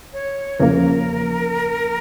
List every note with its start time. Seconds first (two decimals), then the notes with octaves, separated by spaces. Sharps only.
0.13 C#5
0.59 E2 C#3 F3 A#3 A#4